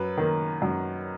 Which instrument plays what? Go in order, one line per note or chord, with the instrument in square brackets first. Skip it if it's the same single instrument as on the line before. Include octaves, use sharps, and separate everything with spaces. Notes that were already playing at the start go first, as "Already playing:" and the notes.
Already playing: [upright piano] F#2 B4
D#3 A#3
F#2